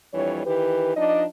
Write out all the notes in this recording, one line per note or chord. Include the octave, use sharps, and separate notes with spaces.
F2 E3 G3 D4 C#5
D#3 E3 G4 B4
F3 D4 D#4 D5 D#5